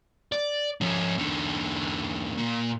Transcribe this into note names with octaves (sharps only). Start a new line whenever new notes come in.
D5
F3 C#4
E2 D3
A#2